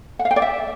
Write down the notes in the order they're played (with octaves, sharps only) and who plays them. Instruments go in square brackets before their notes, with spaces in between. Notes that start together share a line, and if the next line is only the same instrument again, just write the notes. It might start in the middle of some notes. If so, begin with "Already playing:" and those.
[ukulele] F#5
F5
G5
D5
E5